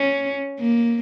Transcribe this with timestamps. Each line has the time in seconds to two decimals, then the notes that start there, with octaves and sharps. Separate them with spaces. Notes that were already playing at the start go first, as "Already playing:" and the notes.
Already playing: C#4
0.60 A#3